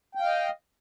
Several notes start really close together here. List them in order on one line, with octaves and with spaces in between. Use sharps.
G5 F5 D#5